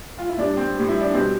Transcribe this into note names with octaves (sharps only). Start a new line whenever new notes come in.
F4
E4
A2 G3 D4
C4
A2 G3
E4
D4
B2 G3 C4